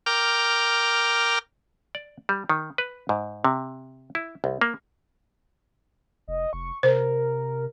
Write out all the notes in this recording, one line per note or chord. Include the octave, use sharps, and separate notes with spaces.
A#4 G5 D6 F6
D5
G3
D#3
B4
G#2
C3
E4
C2
A#3
F1 D#5
F1 C#6
C3 A#4 C5